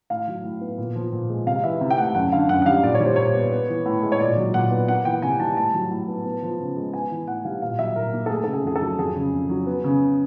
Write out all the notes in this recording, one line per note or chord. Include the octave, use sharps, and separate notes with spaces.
A2 F5
F#3
A2
B3
A#2
F3
A#2
G#3
C3 F5
E3 E5
C3
G5
A3 F#5
F#2 F#5
D3 F5
F#2 F#5
F#5
G3 F5
A#2 D5
C#5
G3
C5
A#2 C#5
B3
B3
E3
A2
G#3
C#5
A#2 D5
F#3
A#2 F#5
B3
A#3 F#5
E3 G5
C3 G#5
G3 A5
A2 A5
F#3
A2
B3
B3
F3
C#3
G#3
B3 G#5
E3
A2 F#5
G3 F5
A#2 F5
F#3 E5
A#2 A#4
A#3
A4
A3 G#4
C#3 A4
G#4
F2 G#4
A4
F#3
F2 G#4
C#3
F2
F#3
B3
C#3